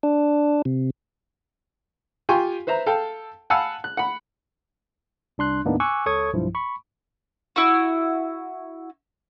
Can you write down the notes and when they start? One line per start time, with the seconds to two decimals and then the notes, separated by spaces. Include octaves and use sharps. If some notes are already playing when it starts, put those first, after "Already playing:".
0.03 D4
0.65 C3
2.29 F4 G4 G5 G#5 C6 C#6
2.67 B4 C5 E5 A#5
2.86 A4 F5 G5 A5
3.50 F5 F#5 G#5 A5 B5 E6
3.84 F#6
3.97 F#5 B5
5.38 C2 D4 C6 F#6
5.65 D#2 A2 A#3 B3 D4 D#4
5.80 G#5 C#6 D6 E6 F#6
6.06 C#2 A4 C#5 C#6 D#6 G#6
6.33 B1 G2 F3 E4
6.55 B5 C#6
7.56 E4 F#4